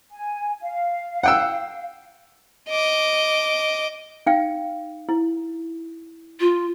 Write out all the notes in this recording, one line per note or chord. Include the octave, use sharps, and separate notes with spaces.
G#5
F5
F#5 G5 E6
D#5 D6
D#4 F5 G5
E4
F4